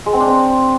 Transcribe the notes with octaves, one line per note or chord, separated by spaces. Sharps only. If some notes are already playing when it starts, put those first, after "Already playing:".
G#3
C4
D4
C4